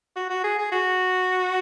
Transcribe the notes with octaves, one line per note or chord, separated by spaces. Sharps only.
F#4
F#4
G#4
G#4
F#4